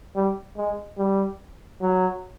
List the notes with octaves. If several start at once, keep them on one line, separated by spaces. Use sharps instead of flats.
G3
G#3
G3
F#3